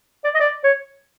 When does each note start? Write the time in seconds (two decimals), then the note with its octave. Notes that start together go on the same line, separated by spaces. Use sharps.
0.24 D5
0.34 D#5
0.40 D5
0.64 C#5